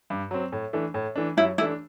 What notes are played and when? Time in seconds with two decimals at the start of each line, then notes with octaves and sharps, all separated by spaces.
0.10 G2
0.31 F#3 C4
0.52 A2
0.73 E3 A3 D4
0.94 A2
1.16 E3 A3 D4
1.37 F#2 E4
1.58 E3 A3 D4 E4